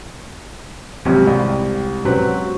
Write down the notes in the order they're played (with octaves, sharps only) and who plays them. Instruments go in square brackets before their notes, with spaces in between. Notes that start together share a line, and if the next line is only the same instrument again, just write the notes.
[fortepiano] C#2 F#2 C3 [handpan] G#3 C4 G4
[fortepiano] C2
[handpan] B2 C#4 F#4 [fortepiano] F#3 C4 B4